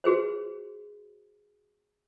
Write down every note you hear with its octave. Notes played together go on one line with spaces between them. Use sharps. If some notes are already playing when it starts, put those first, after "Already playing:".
F#4 G#4 B4 C5